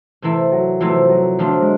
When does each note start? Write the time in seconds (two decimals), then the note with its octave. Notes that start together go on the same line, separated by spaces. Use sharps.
0.22 C3 E3 A3 C4 E4
0.52 F#3
0.80 C3 E3 F3 A3 C4 E4
1.09 F#3
1.39 D3 F3 F#3 A3 D4 F4
1.62 G#3